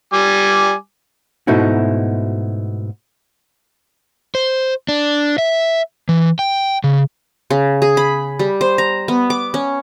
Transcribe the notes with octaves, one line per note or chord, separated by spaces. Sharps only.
G3 G#5 D6
G#2 B2 A3 D#4 E4 F#4
C5
D4
E5
E3
G5
C#3
C#3
G#4
B5
G3
C5
A#5
B3
D6
C#4